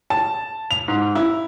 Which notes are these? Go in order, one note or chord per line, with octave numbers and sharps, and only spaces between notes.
A5
F7
G#2
E4